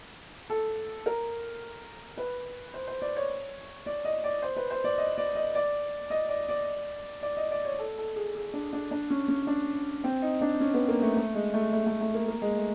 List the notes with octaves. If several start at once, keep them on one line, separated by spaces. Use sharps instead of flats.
A4
A#4
B4
C5
C5
D5
C#5
D5
D#5
D5
C5
B4
C5
D5
D#5
D5
D#5
D5
D#5
D5
D5
D5
D#5
D5
C#5
A4
A4
G#4
G#4
D4
D4
D4
C#4
C#4
D4
C4
D#4
D4
C#4
B3
A#3
A3
A3
G#3
A3
A3
A3
A3
A#3
A#3
G#3
A3